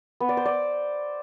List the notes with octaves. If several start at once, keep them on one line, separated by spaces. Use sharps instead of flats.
B3
D5
C5
D5